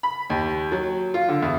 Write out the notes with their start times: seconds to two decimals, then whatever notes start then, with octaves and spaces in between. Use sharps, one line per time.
0.03 B5
0.30 D#2
0.72 F#3
1.14 F4
1.29 D3
1.42 E2